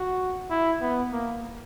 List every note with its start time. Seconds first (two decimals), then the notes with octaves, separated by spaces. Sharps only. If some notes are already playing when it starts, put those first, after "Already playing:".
Already playing: F#4
0.50 E4
0.81 B3
1.12 A#3